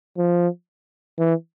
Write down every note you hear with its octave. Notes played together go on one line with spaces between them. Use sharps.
F3
E3